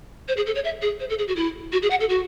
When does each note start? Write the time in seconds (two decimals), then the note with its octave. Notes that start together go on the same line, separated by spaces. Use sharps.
0.28 C5
0.37 G#4
0.46 A4
0.55 C#5
0.65 E5
0.82 G#4
1.00 C5
1.09 A4
1.19 G#4
1.28 F#4
1.36 E4
1.72 F#4
1.82 G#4
1.90 F#5
2.00 A4
2.09 F#4